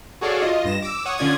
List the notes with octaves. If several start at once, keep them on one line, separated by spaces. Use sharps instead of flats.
F#4 G#4 A4 C#5 D5 F5
F4 D#5
G2 A#6 E7
D6 E6
C#5 F#5 C#6 D#6
D3 C#4 F4 D5 D#6 G#6